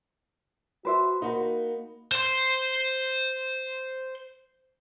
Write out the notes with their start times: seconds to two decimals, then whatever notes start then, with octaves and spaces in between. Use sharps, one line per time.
0.85 F#4 B4 C5 E5
1.22 A#3 D#4 F#4 B5
2.12 C5 C6